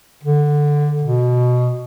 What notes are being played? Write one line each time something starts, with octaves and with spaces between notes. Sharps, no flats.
D3
B2